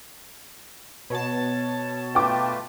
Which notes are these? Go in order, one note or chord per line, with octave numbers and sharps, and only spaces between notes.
B2 C#5 A5
A3 F4 B4 G5 D6